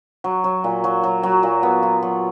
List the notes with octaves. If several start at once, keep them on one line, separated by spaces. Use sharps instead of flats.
F#3
F#3
A#2
F#3
F#3
F#3
A#2
B3
F4
F#3